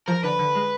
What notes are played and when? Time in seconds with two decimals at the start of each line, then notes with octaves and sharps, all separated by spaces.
0.08 F3 A#4
0.23 D3 B4
0.39 D3
0.55 G#3